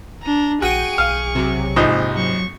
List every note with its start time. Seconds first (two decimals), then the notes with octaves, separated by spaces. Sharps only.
0.23 D4 A#5
0.62 A#1 F#4 G#4 G5 C#6 D#7
0.98 B1 F5
1.35 C3 F#3
1.76 A#1 G#2 C3 F3 D#4
2.17 F#3 C#6